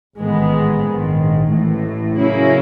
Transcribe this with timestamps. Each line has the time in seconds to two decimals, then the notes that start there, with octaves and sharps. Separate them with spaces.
0.17 A1 G#2 D#3 G#3 B3
0.83 A#1 G#2 D#3
1.50 A1 A2 E3
2.16 C#3 F#3 A#3 C#4 E4